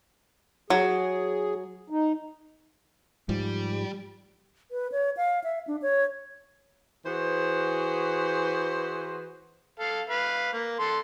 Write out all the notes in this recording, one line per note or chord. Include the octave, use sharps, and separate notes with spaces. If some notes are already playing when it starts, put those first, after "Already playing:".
F#3 G#4
D#4
G#2 F3 G3
B4
C#5
F5
E5
D4
C#5
E3 F#4 G#4 B4 C5
A4 F5
B4 F5
A#3
A4 C6